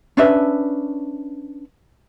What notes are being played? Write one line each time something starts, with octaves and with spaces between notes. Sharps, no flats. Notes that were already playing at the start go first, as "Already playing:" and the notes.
C#4 D4 B4 E5